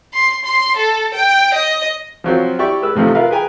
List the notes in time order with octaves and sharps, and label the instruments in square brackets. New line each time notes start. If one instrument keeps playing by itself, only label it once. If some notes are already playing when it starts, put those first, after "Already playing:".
[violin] C6
C6
A4
G5
D#5
[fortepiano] F3 F#3 C4
E4 G4 D5 E5 C#6
G#3 B4 E6
A2 C3 F3 A3 D#4
F4 A#4 B4 E5 F5
G#4 B4 G5 G#5 A#5